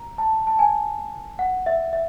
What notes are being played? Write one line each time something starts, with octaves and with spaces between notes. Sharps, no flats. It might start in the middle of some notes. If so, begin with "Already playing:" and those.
Already playing: A#5
A5
A5
G#5
F#5
E5
E5